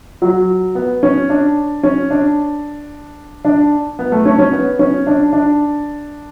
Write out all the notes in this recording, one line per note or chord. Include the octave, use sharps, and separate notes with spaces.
F#3
B3
C#4
D4
C#4
D4
D4
B3
A3
C#4
C#4
B3
C#4
D4
D4